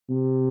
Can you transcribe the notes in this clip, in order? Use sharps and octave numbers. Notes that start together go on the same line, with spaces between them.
C3